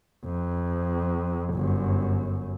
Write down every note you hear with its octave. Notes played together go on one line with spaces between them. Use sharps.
F2
G1 F#2